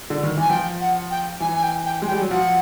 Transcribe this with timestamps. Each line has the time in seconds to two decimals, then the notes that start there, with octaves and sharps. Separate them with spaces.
0.10 D3
0.23 D#3
0.37 E3 G#5
0.50 F3 G5
0.80 F#5
1.10 G5
1.40 E3 G#5
1.56 G#5
1.63 G5
1.85 G5
2.02 G#3
2.07 G5
2.11 G3
2.21 F#3
2.31 F3 F#5